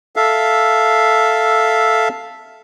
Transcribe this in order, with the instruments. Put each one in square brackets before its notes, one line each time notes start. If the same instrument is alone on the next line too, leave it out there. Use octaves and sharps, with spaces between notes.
[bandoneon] A4 E5 F5